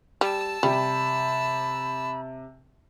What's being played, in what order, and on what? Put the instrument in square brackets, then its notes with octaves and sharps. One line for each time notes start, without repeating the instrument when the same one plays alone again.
[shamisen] G3 [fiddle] A5 E6
[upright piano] C3 [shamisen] G3 [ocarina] B5